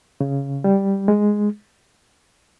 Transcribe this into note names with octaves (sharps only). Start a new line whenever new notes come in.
C#3
G3
G#3